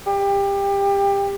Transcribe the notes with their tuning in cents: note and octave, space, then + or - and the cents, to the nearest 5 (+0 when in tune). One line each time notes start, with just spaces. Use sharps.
G4 +20